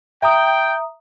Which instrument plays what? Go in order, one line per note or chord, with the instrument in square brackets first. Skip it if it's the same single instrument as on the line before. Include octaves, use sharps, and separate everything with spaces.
[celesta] E5 A#5 D#6 [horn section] G5